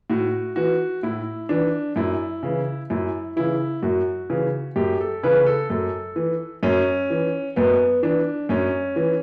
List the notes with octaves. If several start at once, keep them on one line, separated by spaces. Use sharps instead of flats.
A2 F#4
E3 F#4
A2 E4
E3 D4
F#2 E4
C#3 E3
F#2 E4
C#3 E3 E4
F#2 F#4
C#3 E3
F#2 G4
A4
C#3 E3 B4
A4
F#2 A4
E3
F#2 C#4
E3
F#2 B3
E3 D4
F#2 C#4
E3